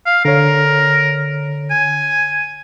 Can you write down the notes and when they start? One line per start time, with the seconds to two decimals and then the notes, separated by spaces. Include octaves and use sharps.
0.06 F5
0.25 D3 A#4 C#5
1.71 G#5